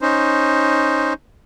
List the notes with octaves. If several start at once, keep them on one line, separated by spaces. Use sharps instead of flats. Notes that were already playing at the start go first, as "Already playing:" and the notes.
C#4 D#4 C5